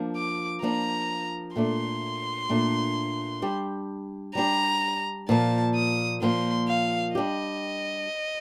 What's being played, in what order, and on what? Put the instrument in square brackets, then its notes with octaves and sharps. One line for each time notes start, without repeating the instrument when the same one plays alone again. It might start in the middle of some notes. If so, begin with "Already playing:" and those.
Already playing: [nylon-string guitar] F3 A#3 D4
[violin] D6
[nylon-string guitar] F3 A#3 D4 [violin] A#5
[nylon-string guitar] A#2 A3 D4 [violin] C6
[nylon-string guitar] A#2 A3 D4
G3 D4 G4
[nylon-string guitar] G3 D4 G4 [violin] A#5
[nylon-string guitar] A#2 F3 A#3 [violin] A5
[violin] D#6
[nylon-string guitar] A#2 F3 A#3 [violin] C6
[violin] F5
[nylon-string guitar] G3 D4 G4 [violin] D#5